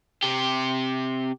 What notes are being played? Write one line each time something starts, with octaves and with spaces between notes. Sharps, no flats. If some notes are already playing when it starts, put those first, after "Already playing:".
C3 G4